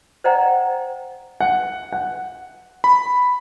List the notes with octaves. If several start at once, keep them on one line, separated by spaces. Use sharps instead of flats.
C5 D5 D#5 F#5 G5 A#5
F#5
F#5
B5